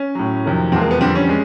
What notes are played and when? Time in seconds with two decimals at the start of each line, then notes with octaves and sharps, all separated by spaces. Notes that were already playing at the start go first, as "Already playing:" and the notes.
Already playing: C#4
0.15 A2 F#3
0.44 F2 C3 D#3 F#3
0.72 E2 C3 F3 G#3 C4
0.81 A#3
0.91 B3
1.01 F2 D3 G3 C4
1.15 C#4
1.29 G#3